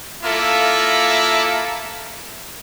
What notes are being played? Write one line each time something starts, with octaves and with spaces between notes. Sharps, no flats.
A#3 E4 F4 A4